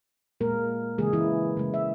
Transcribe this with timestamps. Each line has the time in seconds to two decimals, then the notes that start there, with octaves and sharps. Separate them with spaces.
0.41 A#2 G#3 A#3 A#4
0.98 C#3 E3 G#3 A#3 G#4
1.13 E3 E4
1.57 C#3 G#3
1.74 E5